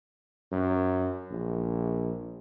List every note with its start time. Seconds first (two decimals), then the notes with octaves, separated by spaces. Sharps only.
0.52 F#2
1.31 A#1